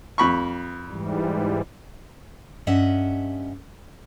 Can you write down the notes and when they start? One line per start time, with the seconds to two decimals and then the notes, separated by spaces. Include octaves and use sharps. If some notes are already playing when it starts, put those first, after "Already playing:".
0.18 F2 B5 C#6
0.88 G#2 E3 G3
2.67 G2 C#4 D#5 E5 F#5